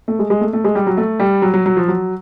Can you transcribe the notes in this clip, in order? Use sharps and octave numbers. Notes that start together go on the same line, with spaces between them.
A3
G#3
G#3
A3
A3
G#3
G3
F#3
A3
G3
F#3
F#3
F#3
F3
F#3